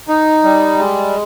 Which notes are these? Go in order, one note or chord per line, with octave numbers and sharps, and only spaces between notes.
D#4
G3
G#3